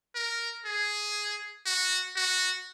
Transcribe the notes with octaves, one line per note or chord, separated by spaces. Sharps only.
A#4
G#4
F#4
F#4